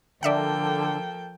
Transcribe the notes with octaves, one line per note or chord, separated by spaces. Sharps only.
D3 F3 A#3 A4 D5 E5 F#5 G5